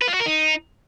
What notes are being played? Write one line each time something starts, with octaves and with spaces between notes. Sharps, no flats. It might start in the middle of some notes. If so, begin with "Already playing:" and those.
B4
F4
F#4
A#4
D#4